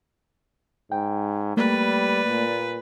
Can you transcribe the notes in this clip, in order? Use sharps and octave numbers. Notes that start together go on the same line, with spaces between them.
G#2 G5
G3 A3 A#3 B4 D5
A#2